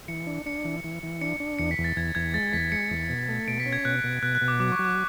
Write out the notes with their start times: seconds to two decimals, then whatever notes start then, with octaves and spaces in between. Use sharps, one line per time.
0.08 E3 C#7
0.27 D4
0.46 D4 C#7
0.65 E3
0.84 E3
1.03 E3
1.21 D4 C#7
1.40 D4
1.59 E2 C#7
1.71 B6
1.78 E2
1.84 A6
1.96 E2 G#6
2.15 E2 G#6
2.34 G#3 A6
2.53 E2 B6
2.72 G#3 C#7
2.91 E2
3.09 B2
3.28 A3
3.48 B2 D7
3.60 B6
3.66 C#4
3.73 G#6
3.85 B2 F#6
4.04 B2
4.23 B2 F#6
4.35 F#6
4.42 B2
4.48 D6
4.60 F#3 D6
4.72 C#6
4.79 F#3
4.85 D6